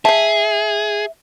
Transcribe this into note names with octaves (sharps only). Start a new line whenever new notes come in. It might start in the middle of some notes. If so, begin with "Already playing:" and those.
G#4 E5 F5 A5